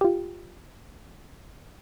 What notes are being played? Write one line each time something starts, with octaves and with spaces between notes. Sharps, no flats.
F4 G4